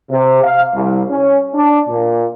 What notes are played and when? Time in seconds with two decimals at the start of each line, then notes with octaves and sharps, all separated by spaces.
0.11 C3
0.44 F5
0.75 C2
1.09 C#4
1.54 D4
1.89 A#2